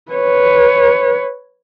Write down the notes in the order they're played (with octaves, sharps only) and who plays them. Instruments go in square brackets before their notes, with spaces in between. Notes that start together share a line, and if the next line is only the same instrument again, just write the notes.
[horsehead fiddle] B4 C#5